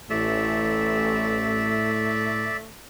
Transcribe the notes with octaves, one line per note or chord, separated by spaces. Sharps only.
A1 A2 A3 D5 E5